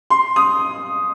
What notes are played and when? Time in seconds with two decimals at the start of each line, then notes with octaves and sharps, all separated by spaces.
0.10 C6
0.36 D#6